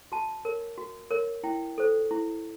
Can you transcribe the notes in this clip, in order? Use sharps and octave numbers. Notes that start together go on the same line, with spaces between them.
F#4 A5
A#4 C#5
F#4
A#4 C#5
E4 G5
A4 C5
E4